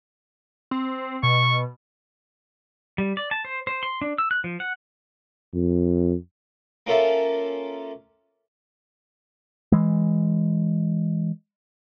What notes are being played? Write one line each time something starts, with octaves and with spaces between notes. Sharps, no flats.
C4
B2 C#6
G3
D5
A5
C5
C5
C6
D4
E6
F#6
F3
F#5
F2
A#3 C#4 F4 A4 A#4 E5
E3 G#3